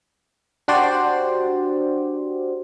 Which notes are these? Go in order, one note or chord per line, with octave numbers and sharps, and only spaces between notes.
D4 F#4 G4 C5 D5